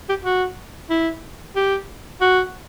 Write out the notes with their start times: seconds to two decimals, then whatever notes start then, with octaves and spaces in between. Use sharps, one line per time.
0.09 G4
0.25 F#4
0.90 E4
1.56 G4
2.21 F#4